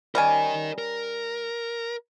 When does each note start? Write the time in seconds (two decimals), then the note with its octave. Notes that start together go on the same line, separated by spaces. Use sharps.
0.15 G3 C#4 A#4 D#5 G#5
0.78 A#4